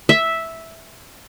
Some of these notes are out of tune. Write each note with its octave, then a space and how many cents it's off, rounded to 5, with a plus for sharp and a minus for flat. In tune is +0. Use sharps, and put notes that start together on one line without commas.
E5 -5